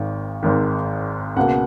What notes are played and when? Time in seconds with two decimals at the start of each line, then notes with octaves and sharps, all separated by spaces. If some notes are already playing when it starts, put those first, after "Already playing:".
Already playing: G#1 G#2 D#3
0.43 G#1 G#2 D#3
1.36 C#2 B2 A#3 F#5